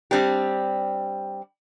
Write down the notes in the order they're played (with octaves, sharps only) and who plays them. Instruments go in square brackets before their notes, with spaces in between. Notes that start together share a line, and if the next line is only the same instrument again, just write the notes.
[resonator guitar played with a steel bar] G3 C4 D4 G4